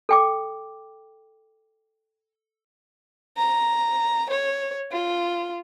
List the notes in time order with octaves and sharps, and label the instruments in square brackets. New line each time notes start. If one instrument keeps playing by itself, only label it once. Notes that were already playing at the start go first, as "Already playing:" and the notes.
[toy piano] A4 G5 D6
[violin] A#5
C#5
F4